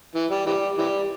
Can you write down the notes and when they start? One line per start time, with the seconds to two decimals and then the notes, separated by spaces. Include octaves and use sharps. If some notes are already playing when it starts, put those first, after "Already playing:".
0.15 E3
0.31 G3
0.46 E3 G3
0.78 E3 G3